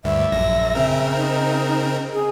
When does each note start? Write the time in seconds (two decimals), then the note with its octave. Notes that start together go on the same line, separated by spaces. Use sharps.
0.04 D2 G2 E5
0.31 A#1 F#2 A#6
0.75 C#3 C4 A#4
1.15 D#4
2.13 G#4